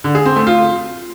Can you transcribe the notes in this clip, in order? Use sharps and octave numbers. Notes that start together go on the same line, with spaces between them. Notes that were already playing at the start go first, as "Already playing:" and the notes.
D3
G#4
C4
A3
F4